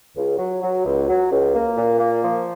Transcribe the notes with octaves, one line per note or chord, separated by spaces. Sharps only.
C#2
F#3
F#3
C#2
F#3
C#2
A#3
A#2
A#3
F3